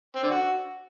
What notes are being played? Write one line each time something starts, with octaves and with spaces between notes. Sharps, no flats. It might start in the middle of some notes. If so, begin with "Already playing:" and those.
C4
D3
F#4